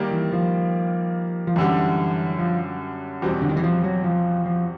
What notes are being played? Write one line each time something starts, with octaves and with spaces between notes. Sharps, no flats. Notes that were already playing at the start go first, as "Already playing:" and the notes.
Already playing: D#3 G3 A#3
E3
F3
F3
F#2 D3 E3 G3
F3
E2 B2 G3 C4
D3
D#3
E3
F3
F#3
F3
F3